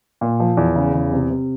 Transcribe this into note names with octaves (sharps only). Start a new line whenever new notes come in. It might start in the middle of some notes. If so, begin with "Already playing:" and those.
A#2
F3
E2
C#3
E2
C3
C3